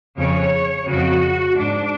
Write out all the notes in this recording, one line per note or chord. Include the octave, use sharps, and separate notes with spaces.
F2 C#3 C#5
F2 C#3 F#4
G#2 D4